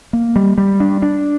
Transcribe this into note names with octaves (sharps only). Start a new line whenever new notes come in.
A#3
G3
G3
D4
D4